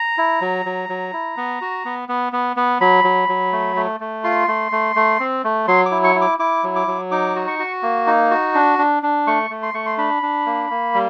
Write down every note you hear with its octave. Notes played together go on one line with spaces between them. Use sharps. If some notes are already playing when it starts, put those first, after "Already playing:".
Already playing: A#5
E4
F#3
F#3
F#3
E4
B3
F#4
B3
B3
B3
B3
F#3 B5
F#3
F#3
A3
A3
A3
F4 C6
A3
A3
A3
C4
A3
F#3 C6
D6
E4
C#6
E4
D6
E4 D6
F#3
D6
F#3
D#4 D6
F#4
C#6
F#4
A#3
D#4
F#4
D4
D4
D4
A3 C#6
A3
C6
A3 C#6
C6
D4 B5
D4
A#3
A#3
G3